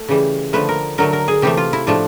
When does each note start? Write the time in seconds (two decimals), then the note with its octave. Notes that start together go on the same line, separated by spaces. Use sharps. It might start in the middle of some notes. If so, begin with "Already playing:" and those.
Already playing: A3
0.08 C#3 E3 G3
0.53 D3 F3 A3 B4
0.69 A#4
0.98 D3 F#3 A3 A#4
1.13 A#4
1.28 G#4
1.42 C3 E3 A3 G4
1.57 F4
1.73 E4
1.87 A2 F3 A3 D4